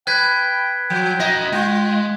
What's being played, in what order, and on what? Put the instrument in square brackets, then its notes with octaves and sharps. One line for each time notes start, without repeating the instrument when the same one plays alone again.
[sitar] B4 [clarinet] G5 [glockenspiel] F#6 G#6 B6
[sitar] F3 [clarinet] G5
[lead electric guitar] F#4 E5 [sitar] D#5
[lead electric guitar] G#3 [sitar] F4 [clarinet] G5